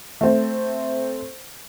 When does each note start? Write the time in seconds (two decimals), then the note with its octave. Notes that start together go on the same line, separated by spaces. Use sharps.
0.21 A3 C4